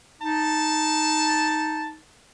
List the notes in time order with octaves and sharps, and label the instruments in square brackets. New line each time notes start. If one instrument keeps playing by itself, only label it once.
[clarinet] D#4 [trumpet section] A5